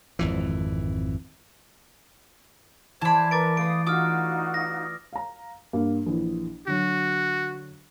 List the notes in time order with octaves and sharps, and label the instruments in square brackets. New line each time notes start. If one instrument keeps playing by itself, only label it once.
[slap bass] G#1 F2 E3
[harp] E3 D5 [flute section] C5 G#6 [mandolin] A5 B5
[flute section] A#4 B4 [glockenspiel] D6 A6 D7
[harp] A3 B4 [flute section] F5 D#6 [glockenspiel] D7
[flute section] D#4 F#4 F5 [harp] F4 [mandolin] D6 [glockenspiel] D#6 F6
[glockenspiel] A#6
[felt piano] F5 A#5
G2 A#3
A#1 E3
[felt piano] D3 F#3 [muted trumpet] F#4